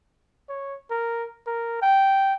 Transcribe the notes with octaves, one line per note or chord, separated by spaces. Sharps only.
C#5
A#4
A#4
G5